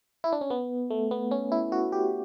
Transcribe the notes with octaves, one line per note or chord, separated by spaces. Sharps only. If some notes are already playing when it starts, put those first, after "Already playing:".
E4
D4
C#4
B3
A3
B3
C#4
E4
F#4
G4